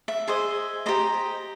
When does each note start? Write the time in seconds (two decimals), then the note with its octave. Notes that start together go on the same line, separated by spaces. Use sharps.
0.08 E5
0.28 G#4 C5 D#5
0.86 G4 C5 D#5 A#5